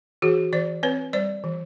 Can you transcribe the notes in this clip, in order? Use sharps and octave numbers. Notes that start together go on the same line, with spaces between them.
E3 F#4 G#4
E3 C5 D5
C4 B4 C#5
G3 C5 D5
E3